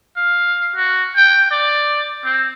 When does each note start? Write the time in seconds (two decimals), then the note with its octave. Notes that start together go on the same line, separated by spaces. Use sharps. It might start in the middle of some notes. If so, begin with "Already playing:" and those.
0.17 F5
0.76 F#4
1.16 G5
1.51 D5
2.24 C4